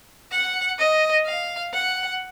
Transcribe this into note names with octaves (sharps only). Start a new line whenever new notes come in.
F#5
D#5
F5
F#5